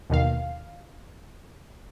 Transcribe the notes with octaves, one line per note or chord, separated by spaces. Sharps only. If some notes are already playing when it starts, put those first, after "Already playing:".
D#2 B2 D#3 F5